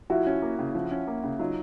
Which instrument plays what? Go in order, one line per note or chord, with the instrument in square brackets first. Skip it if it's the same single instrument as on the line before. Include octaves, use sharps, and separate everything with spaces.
[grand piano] F3 [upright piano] E4 F#4
[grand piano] C#4
A#3
C#3
F3
C#4
A#3
C#3
[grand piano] F#3 [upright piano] D#4 F4